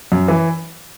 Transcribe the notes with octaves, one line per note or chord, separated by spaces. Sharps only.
F#2
E3